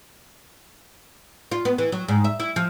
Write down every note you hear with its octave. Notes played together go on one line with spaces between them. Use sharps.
F4
B3
E3
F#3
G#2
E5
E4
F3